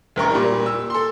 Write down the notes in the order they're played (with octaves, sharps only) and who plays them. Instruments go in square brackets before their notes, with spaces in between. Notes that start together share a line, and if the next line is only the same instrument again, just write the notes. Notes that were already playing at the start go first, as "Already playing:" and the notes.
[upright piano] E1 A1 A#4 C#6
A#2 G3
E6
A4 C6